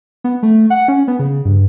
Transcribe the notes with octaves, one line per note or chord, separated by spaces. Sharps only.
B3
A3
F#5
C#4
B3
C#3
G2